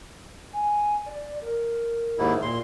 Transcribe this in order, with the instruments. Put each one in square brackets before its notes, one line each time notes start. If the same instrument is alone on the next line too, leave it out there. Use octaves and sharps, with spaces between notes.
[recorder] G#5
D5
A#4
[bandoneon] D#2 G#2 E4
A#2 C6